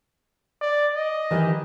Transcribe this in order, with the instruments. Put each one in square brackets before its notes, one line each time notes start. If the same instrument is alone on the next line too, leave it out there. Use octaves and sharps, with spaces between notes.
[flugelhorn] D5
D#5
[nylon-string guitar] D#3 E3 G3